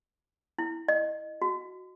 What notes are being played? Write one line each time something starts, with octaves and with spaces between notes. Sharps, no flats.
E4
D#5
F#4